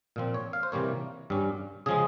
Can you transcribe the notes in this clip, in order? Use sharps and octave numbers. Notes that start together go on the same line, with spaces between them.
A#2 F3 C4
C#5
F5
C5
C3 E3 G3 A#3 C#5
G2 G3 C#4
C#3 F3 G#3 G#4